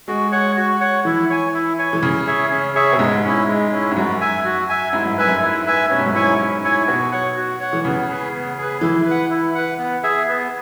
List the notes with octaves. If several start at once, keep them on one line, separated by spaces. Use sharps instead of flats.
G#3 F#4
C#5 F#5
F#4
C#5 F#5
E3 E4
C#5 G#5
E4
C#5 G#5
E3
C#3 C#4
G#4 C#5 E5
C#4
G#4 C#5 E5
B2
G#2 G#3
C#4 E4
G#3
C#4 E4
G#2
F#2 F#4
E5 G#5
F#4
E5 G#5
G#2 E4
F#2
B4 E5 G#5
F#2
E4
B4 E5 G#5
B2 C#4
G#2
F#2
G#2 E4 C#5 G#5
C#4
E4 C#5 G#5
B2 F#4
C#5 F#5
F#4
C#5 F#5
E3
C#3 B3
G#4 B4
B3
G#4 B4
E3 E4
B4
F#5
E4
B4 F#5
B3
G#4 E5
B3